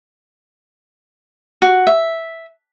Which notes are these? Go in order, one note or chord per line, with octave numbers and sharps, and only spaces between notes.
F#4
E5